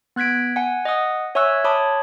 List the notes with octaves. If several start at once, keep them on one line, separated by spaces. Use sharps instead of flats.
B3 F#6 G#6 B6 D7
F#5 G#5
D#5 F#5 D#6
C#5 E5 G#5 C#6 E6 F#6
C#5 A5 B5 D6 D#6